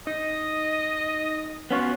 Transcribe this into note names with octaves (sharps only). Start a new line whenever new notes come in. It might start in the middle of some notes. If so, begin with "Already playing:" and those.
D#4 D#5
B3 C#4 F4 F#4